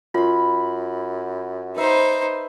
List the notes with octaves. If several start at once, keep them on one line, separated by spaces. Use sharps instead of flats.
F#2 F4 B5 C6
D#4 B4 C5 E5